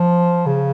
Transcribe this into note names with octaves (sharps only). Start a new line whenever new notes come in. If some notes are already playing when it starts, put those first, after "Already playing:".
Already playing: F3
C#3